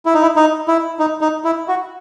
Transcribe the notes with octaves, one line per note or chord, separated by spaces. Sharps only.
E4
D#4
E4
D#4
E4
D#4
D#4
E4
F#4